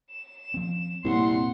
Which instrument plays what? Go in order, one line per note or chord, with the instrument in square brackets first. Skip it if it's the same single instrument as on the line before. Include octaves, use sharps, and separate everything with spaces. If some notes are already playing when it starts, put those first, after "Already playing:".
[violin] E7
[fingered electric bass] F3 C4
[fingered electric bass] F1 A#2 A#3 [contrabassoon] C2 [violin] F#5 C6